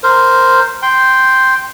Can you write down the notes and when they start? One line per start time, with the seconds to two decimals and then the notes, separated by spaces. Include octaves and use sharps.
0.03 A#4 C5
0.82 G5 C6